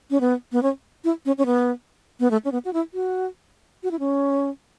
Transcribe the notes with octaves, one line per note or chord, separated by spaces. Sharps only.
C#4
B3
B3
C#4
E4
C#4
C#4
B3
B3
A3
C#4
B3
F#4
E4
F#4
F#4
E4
C#4